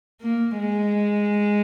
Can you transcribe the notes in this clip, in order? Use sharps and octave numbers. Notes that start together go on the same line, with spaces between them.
A#3
G#3